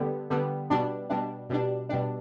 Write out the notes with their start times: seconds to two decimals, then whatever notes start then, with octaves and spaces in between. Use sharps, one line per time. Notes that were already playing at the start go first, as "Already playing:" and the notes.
Already playing: D3 G3 B3
0.30 D3 G3 B3
0.70 B2 G3 D4
1.10 B2 G3 D4
1.50 B2 G3 D4
1.89 B2 G3 D4